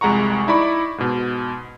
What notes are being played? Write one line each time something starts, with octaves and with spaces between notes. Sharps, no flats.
C2 F2 G#3 F#5 A#5 C#6
D#4 E4 D5 B5 C#6 D6
G#2 B2